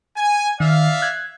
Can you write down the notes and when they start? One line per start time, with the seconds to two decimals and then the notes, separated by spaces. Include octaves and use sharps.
0.17 G#5
0.60 D#3 D5 E5 F5
1.02 F#6 G#6